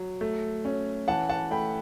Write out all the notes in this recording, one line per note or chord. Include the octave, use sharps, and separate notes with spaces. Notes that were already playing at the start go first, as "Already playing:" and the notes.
Already playing: F#3
A3
C#4
E3 F#5 A5
F#5 A5
A3 G5 B5